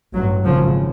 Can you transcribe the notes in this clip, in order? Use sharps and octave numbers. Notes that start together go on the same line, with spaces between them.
A1 G2 F#3
G#1 F#2 C#3 F3